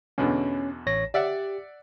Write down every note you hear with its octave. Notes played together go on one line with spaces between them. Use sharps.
E2 B2 D3 C#4
A1 C#5 A#6
G4 D5 E5 F#5